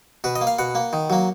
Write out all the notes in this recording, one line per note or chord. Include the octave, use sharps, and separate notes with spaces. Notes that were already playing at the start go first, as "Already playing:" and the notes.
B2 B4
D#5
A#3
F5
B2 F#5
A#3
D#3
F#3 A#3